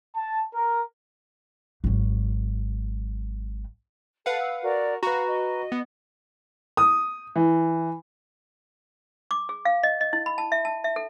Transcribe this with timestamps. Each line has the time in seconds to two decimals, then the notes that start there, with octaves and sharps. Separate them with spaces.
0.15 A5
0.54 A#4
1.84 G#1 F#3
4.26 A4 B4 F5 F#5
4.40 E6
4.61 F#4 A#4 D5
5.03 F#4 B4 F5 A#5
5.26 D#5
5.72 B3
6.77 D#6
7.36 E3
9.31 D6
9.49 G#4
9.65 F5
9.83 D#5
10.01 D#5
10.13 E4
10.26 B5
10.38 A5
10.52 E5
10.65 A5
10.84 E5
10.96 A4